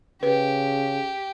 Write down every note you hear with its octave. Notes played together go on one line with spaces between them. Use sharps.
C#3 G4 B4